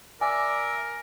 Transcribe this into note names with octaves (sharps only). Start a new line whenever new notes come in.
A#4 D5 E5 G#5